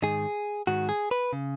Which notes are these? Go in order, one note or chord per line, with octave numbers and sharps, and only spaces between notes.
G#2 D#3 G#4
G#2 D#3 F#4
G#4
B4
C#3